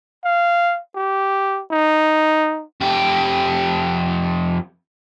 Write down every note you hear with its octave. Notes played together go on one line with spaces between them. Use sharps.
F5
G4
D#4
F2 G4